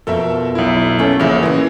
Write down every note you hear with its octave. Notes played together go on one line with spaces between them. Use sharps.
F2 B2 A4 A#4 E5
B1 E4
A3 B3 C#4
A#1 A#2 C#3 E3 E4
A#2 C#3 E3